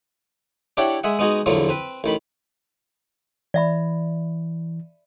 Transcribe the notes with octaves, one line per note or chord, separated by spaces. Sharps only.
D4 E4 G4 C#5 F#5 G5
G#3 G#4 E5 F#5
G#3 B3 D#4 F#4 G#4
A#1 E2 D3 F3 F#3
C4 B4
A1 D#3 B5
E3 D5 E5 B5